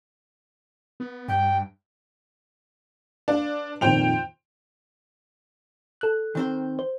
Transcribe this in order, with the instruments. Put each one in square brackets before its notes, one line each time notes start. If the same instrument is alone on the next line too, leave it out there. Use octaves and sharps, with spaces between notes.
[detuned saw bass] B3
[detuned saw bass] G2 [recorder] G5
[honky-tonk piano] D4 [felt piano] B4 F5
[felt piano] F2 A#2 D#3 [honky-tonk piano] C5 G5 F7
[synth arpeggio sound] A4 F#6
[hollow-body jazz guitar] D#3 C4 C5
[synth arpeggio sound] C5